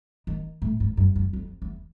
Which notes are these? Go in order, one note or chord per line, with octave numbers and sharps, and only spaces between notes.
D#3
A2
G#2
F#2
F#2
F2
E2